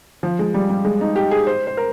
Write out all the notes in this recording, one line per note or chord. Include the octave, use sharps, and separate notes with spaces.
F3
G#3
G3
G3
G#3
D#4
G4
G#4
C5
C5
A#4